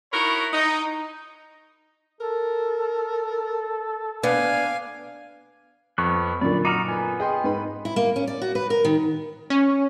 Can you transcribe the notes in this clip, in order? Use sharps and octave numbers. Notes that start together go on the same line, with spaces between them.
D#4 E4 F#4 A#4 C#5 B5
D#4
A4 A#4
B3 D4 F5 G#5
F2 B3 C#6 F#6
F#2 A#2 D3 D5 B5
D#4 F#4 A#5 D6 F6
B3 G#5 B5
G#4 D#5 G5 C6
G#2 B4 B5
E4
A#3
C#4
D5
F#4
B4
A#4
D#3
C#4